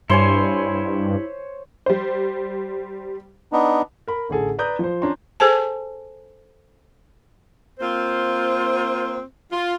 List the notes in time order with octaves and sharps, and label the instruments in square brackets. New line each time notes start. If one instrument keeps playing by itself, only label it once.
[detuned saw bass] G2 [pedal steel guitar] E4 C6 [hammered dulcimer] C5 C#5 G#5
[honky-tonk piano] G3 C5
[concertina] B3 D4 D#4
[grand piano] A#4 B5
A1 D3 G#4 A4
B4 D5 A#5 D#6 G6
F3 C5
C#4 D4 A#5 C6
[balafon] G#4 A4 C5 G#5 A5
[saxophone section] A#3 C4 F4 C5
F4